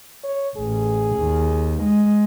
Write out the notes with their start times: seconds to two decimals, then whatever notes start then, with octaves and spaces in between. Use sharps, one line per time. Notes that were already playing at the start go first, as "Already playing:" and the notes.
0.24 C#5
0.57 A1 G#4
1.17 D#2
1.83 G#3